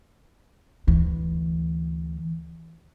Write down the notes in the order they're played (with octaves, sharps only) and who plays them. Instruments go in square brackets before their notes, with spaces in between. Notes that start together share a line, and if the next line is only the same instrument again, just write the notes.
[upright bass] D2 E3